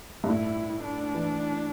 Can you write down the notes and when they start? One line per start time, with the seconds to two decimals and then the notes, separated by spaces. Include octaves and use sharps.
0.24 G2
0.29 A2 E4
0.83 D4
1.15 E3